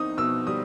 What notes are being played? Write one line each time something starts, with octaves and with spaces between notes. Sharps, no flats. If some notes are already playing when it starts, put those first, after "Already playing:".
Already playing: C4 D#4 D#6
B2 E6
G3 D#6